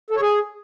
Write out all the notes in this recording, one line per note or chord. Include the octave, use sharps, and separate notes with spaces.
A4
C#5
G#4